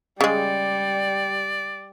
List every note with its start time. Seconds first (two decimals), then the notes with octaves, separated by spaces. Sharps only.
0.21 C#3 G3 G#3 D5